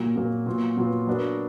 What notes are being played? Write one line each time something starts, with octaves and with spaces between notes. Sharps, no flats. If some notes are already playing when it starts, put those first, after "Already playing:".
Already playing: A#2 F#3 A#3
A#2 F#3 A#3
A#2 F#3 B3 F4
A#2 F#3 B3 F4
F#3 B3 D4 F#4 A#4